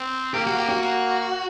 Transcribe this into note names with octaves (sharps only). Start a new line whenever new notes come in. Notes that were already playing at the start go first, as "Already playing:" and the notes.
Already playing: C4
A#3 G4
F#4
G4
F#4
A#3